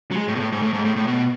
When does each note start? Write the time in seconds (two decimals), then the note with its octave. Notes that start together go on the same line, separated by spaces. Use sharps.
0.11 F#3
0.17 G#3
0.28 A2
0.35 B2
0.40 A2
0.52 G#2
0.62 A2
0.73 G#2
0.85 A2
0.96 A2
1.07 B2